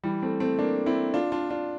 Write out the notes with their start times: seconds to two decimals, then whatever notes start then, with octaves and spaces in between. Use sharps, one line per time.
0.04 E3 G3
0.22 A3 C4
0.40 A3 C4
0.59 A#3 D4
0.86 C4 E4
1.14 D4 F4
1.32 D4 F4
1.50 D4 F4